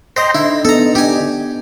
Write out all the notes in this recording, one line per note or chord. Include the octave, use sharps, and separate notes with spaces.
C5 D#5 G5 A#5 C6
D3 D#4 E4
B3 A4 A#5
D4 G4 G#5